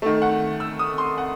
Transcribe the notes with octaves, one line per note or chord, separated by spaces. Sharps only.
D#3 A3
F#5
E6
D#6
C6
F#5